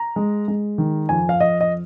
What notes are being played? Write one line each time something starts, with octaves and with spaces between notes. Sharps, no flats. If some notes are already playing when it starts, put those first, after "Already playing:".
Already playing: A#5
G#3
G#3
D#3
F2 G#5
F5
F2 D#5
D#5